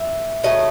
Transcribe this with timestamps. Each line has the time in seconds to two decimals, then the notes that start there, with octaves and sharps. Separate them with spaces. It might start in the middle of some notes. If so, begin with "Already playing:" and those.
Already playing: E5
0.44 C#3 F#3 A3 D#5